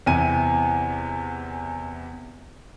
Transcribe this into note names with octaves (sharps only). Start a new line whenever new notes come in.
E2 C3 E3 G#5 D#7